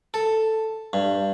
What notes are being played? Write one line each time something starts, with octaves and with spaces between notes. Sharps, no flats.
A4
G2